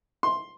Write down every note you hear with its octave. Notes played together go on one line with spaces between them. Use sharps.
C6